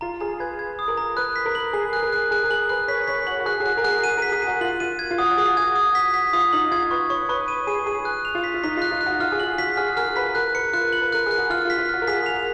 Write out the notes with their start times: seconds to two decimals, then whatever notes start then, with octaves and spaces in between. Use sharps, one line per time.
0.01 F4 A#5
0.20 G#4 A#5
0.40 B4 G#6
0.59 G#6
0.79 D#6
0.88 A#4
0.97 A#5
1.17 B4 F#6
1.36 B6
1.46 A#4
1.55 F#7
1.73 G#4 F#7
1.93 F#6
2.03 A#4
2.12 F#6
2.31 G#4 F#6
2.44 A#4
2.50 G#4 F#7
2.69 B4 F#6
2.88 C#5 B6
3.08 C#5 B6
3.27 F#4 F#7
3.40 F#4
3.46 G#4 F#6
3.60 G#4
3.65 F#4 F#6
3.77 A#4
3.84 G#4 F#6
4.03 A#4 D#7
4.17 A#4 B6
4.32 G#4
4.42 D#7
4.47 F#4
4.61 F4 F#7
4.80 F4 D#7
4.99 G#6
5.11 F4
5.18 F#4 D#6
5.31 F#4
5.37 G#4 D#6
5.57 F#4 G#6
5.76 D#6
5.95 B6
6.14 B6
6.33 F4 D#6
6.53 D#4 F#7
6.71 F4 G#6
6.91 B4 C#6
7.10 C#5 C#6
7.29 B4 C#6
7.48 D#7
7.67 G#4 D#7
7.86 G#4 D#7
8.05 F#6
8.25 F7
8.35 F4
8.44 B6
8.54 F4
8.63 D#4 B6
8.77 F4 F#6
8.91 F4
9.01 F#6
9.06 F#4
9.20 F4 F6
9.32 G#4
9.40 F#4 F#7
9.58 F#4 B6
9.77 G#4 F6
9.97 A#4 F6
10.16 B4 B6
10.35 A#4 F#6
10.54 B4 C#7
10.73 F4 F#6
10.93 F#7
11.02 B4
11.12 A#4 F#6
11.26 G#4 F#6
11.38 F#4
11.50 F4 F6
11.65 F4
11.70 B6
11.78 F4
11.89 F#4 F6
12.02 A#4
12.07 G#4 B6
12.26 F7